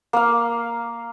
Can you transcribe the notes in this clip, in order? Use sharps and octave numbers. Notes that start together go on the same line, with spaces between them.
A#3 F5